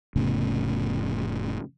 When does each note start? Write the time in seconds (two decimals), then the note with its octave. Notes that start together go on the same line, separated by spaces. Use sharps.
0.16 F1 A2 C#3 B3